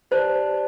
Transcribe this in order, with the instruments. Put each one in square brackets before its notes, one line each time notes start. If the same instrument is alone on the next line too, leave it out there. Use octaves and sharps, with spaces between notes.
[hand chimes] G4 D5 A5 [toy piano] C5